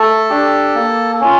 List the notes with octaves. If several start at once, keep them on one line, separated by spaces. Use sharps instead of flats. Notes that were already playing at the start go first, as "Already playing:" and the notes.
Already playing: A3 A4 A5
D4 G4
A#3
C#4 F4